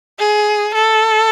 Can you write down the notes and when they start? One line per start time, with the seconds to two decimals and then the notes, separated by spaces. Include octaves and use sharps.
0.19 G#4
0.74 A4